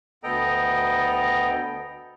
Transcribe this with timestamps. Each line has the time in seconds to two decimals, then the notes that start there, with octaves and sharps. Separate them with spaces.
0.24 D2 B3 A4 D#5 G5 A#5